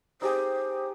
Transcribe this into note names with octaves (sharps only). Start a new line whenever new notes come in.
D#4 G4 G#4 C5